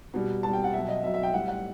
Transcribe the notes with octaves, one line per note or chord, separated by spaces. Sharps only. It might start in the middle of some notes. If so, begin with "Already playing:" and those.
B2 G3
B2 G3 A5
G5
F#5
B2 F#3 E5
D#5
B2 F#3 E5
E5
G5
A2 G3 F#5
F#5